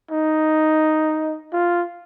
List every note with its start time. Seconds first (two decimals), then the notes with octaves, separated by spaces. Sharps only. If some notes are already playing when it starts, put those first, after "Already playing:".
0.12 D#4
1.53 F4